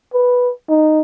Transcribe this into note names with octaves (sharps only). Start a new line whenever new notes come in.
B4
D#4